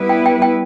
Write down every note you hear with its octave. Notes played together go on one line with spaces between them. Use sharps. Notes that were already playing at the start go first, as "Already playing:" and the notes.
Already playing: G3 B3 E4 B4
G5
G5
G5